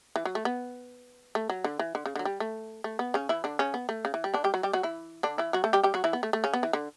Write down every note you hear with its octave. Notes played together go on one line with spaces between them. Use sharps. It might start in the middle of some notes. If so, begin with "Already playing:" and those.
E3
F#3
A3
B3
A3
F#3
D3
E3
D3
C#3
D3 F#3
G3
A3
A3
B3
C#3 C#4
E3 E4
D3 D4
C#3 C#4
B3
A3
C#3
E3
G3
D3 D4
G3 G4
F#3 F#4
G3 G4
F#3 F#4
E3 E4
D3 D4
E3 E4
F#3 F#4
A3 A4
G3 G4
G3 G4
F#3 F#4
E3 E4
B3
A3
A3
C#3 C#4
B3
E3
D3